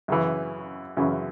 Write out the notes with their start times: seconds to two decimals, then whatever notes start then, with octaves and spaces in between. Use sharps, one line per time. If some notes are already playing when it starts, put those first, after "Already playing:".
0.08 F#2 C#3 E3
0.97 F#2 C#3 E3